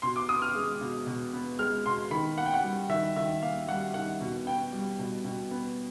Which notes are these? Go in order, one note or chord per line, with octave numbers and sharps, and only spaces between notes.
B2 C6
D6
B3 D#6
F6
G#3
B2
B2
B3
G#3 F6
B2 C6
D#3 B5
A#3 F#5
G5
F#5
G3
D#3 E5
D#3 E5
A#3 F5
G3 F#5
D#3 F#5
B2
B3 G5
G3
B2
B2
B3